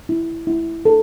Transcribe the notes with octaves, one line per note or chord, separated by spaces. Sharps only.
E4
E4
A4